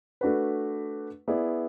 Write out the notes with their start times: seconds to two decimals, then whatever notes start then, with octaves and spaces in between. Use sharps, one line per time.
0.21 A3 D4 F#4 B4
1.28 B3 E4 G#4 D5